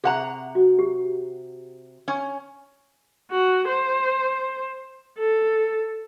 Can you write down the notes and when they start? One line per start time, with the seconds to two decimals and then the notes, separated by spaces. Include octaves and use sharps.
0.04 C3 G#4 F#5 A#5
0.55 F#4
0.79 G4
2.08 C#4
3.31 F#4
3.68 C5
5.19 A4